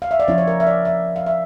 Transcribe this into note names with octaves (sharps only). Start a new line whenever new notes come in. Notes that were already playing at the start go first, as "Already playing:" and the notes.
F5
E5
D5
F3 C#4 E4 C#5
C#5
A#4
E5
D5
E5
F5
E5